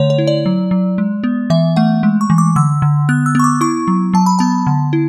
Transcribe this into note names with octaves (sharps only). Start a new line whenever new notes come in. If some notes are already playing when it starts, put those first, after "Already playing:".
Already playing: D3 A3 C#5
C#5
E4
D5
F#3
F#3
G#3
B3
E3 E5
A3 F#5
G#3
C#6
E3
D6
D3 E6
D3
B3 F#6
E6
B3 C#6
D6
E4 C#6
F#3
F#3 A5
B5
B3 A5
D3
E4